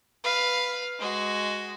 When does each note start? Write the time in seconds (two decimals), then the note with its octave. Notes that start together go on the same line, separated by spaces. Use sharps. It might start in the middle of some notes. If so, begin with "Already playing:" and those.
0.24 B4 F5
0.99 G#3 F#4